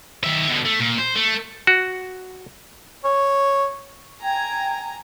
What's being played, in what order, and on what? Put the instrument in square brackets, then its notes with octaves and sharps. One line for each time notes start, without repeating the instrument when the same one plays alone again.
[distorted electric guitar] D#3 E5
B2 D3
A3
A#2
C5
A3
[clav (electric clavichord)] F#4
[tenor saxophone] C#5
[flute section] G5 G#6 [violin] G#5 A#5